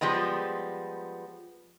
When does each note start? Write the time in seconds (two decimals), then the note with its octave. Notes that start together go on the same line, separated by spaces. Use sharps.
0.01 F3 G3 G#3 B3